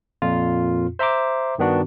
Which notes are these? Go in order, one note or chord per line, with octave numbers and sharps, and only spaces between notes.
F2 A#2 F4
C5 E5 A#5 C6 D6
G2 D#3 B3 D4 F#4